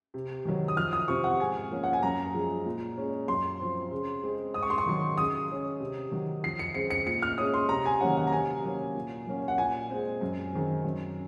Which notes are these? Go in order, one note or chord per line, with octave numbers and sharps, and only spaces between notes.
C3
D#3 F#3
D#6
F2 F6
D#6
C3 F3 C4 C#6
F#5
G#2 G#5
F3 A#3 C#4
F#5
G#5
F#2 A#5
F3 G#3
A#2
G#3 C#4
F#2 C6
F3 C4
C#3
G#3 C4
G#2 D#6
C#6
C6
C#6
D#3 F#3
C#3 D#6
G#3 C#4
C3
D#3 F#3
F2 C7
C#7
C#3 G#3 C4 C#7
C#7
A#2 C#7
F6
G#3 C#4 D#6
C6
C3 A#5
G#5
D#3 F#3 A#3 C#4 F#5
F#5
A#5
C3 G#5
F#3 A#3 C#4
A#2
F#3 A#3 C#4
F#5
A#2 G#5
G#3 C4
F#2
D#3 G#3 C4
F#2